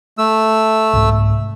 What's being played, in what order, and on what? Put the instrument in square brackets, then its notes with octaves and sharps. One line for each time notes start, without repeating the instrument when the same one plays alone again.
[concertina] A3 E6
[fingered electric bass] C2 G#2